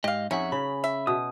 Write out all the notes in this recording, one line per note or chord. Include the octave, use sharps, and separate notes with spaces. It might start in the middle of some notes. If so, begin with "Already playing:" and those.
G#2 G4 D#5 F5
F2 C#4 D#4 G#4 E5 F#5
C#3 B5
E5
B2 D#6